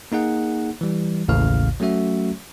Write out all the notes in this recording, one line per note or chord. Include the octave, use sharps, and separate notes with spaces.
A#3 D#4 G#4 F#5
E3 G3
A1 D#2 A2 C#3 F5 F6
F#3 A3 C#4 F#4 E5